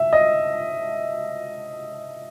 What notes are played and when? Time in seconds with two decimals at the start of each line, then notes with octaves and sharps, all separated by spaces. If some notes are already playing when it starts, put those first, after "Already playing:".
Already playing: E5
0.13 D#5